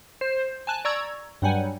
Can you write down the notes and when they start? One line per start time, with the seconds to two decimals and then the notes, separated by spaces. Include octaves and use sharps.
0.21 C5
0.67 G#5 A5 F#6
0.85 D5 A#5 C#6 E6 G#6
1.42 G2 F#3 G3 F#5 G#5